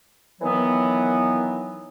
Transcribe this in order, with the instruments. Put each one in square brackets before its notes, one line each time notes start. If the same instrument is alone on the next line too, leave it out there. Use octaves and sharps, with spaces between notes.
[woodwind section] D#3 E3 F#3 B3